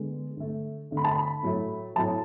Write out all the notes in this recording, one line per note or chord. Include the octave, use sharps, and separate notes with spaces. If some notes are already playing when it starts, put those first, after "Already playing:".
Already playing: D3 G#3 B3
D3 A3
D3 A3
B5
A5
B5
A2 F#3 A3
A2 F#3 A3 A5